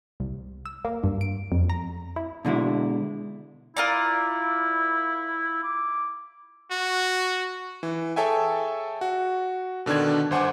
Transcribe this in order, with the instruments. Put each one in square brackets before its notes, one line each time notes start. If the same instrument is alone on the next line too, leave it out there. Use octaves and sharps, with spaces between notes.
[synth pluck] C2
E6
A#3
G2
D7
F2
A#5
E4
[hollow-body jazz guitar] B2 D3 G#3 E4
[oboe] E4 [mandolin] F4 A#4 D5
[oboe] D6
[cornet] F#4
[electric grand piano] E3
G#4 A4 C#5 E5 G5 G#5
F#4
B2 D3 D#3 D4 G#6
G1 C5 F#5 G#5 D6